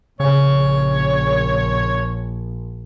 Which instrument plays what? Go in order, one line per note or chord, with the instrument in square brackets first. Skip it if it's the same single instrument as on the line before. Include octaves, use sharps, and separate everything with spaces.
[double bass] A#1 [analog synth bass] C#3 [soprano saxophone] C#5